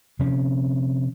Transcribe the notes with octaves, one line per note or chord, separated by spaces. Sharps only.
C3 F3 C4 C#4